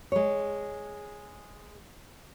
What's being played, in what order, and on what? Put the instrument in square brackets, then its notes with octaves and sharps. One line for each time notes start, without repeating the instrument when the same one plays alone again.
[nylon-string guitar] G#3 C#5